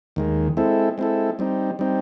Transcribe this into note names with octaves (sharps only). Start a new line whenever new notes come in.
D#2 D#3 G#3
G#3 C4 E4 A4
G#3 C4 E4 A4
G3 C4 D#4
G3 C4 D#4